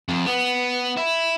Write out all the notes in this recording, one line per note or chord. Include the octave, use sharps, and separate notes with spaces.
F2
B3
E4